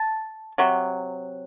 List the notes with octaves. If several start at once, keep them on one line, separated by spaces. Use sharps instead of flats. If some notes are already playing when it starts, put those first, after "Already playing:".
Already playing: A5
C3 F#3